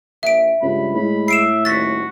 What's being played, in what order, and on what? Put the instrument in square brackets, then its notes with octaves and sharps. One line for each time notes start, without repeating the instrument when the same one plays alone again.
[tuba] A#1 [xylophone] E5 D7
[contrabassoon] C#2 [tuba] G2 [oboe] B5
[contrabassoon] A2 [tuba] G#3 [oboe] B5
[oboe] E5 [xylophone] C7 D7 E7
[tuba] D#1 [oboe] F#4 [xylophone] A6 B6